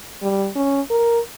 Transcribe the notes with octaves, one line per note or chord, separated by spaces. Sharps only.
G3
C#4
A#4